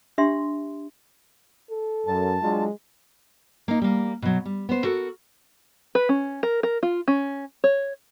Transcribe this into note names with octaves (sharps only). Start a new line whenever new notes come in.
D4 G4 E5 C6
A4
F#2 A5
F#3 G#3 D4 F4
A#3 D#4
G3 A#3
B2 F#3
G3
B3 C5
F#4 A4 A#4
B4
C#4
A#4
A#4
F4
C#4
C#5